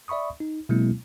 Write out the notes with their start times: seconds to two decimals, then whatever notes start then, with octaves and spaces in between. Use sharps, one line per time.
0.08 D5 E5 B5 C#6 D#6
0.40 D#4
0.69 B2 F#3 G#3 A#3 C4 E4